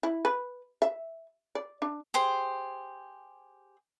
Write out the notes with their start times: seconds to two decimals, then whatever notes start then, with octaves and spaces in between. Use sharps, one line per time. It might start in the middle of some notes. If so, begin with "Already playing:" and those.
0.03 E4
0.25 B4
0.82 E5
1.55 D5
1.82 D4
2.14 G4 G#4 C5